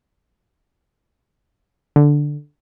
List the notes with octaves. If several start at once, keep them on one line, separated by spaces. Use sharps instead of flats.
D3